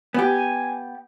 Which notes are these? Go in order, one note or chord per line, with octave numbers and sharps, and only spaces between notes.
B3 G4 G#5